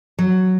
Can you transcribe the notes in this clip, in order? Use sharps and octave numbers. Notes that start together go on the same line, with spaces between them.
F#3